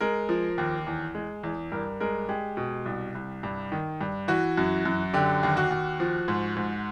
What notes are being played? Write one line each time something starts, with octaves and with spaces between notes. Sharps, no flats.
G#3 A#4
F3
D#2
E2
G#3
E2
G2 A#4
G#3 A#4
G#3 G4
B2
C2
C2
G2
D#3
G2
E3 F#4
F#2
F#2
D3 G4
D#2
F#4
D#2
F3
G#2
G#2